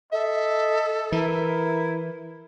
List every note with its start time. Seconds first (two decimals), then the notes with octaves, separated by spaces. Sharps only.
0.12 A4 D#5 E5
1.12 E3 E4 A#4